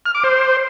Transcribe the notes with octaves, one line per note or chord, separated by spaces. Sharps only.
F6
D6
C5